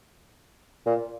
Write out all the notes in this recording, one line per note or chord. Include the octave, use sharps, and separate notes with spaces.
A#2